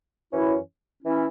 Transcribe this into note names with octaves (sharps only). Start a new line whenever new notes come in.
F#2 E3 C#4 E4
E3 C#4 E4